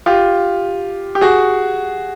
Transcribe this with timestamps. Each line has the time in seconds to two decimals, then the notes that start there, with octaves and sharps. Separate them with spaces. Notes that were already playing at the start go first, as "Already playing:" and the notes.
0.06 F4 G4
1.15 G4
1.21 F#4 G#4